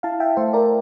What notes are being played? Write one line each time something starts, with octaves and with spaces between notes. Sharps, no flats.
E4 F5 A5
E5 G5
A3 C5 E5
A#4 D5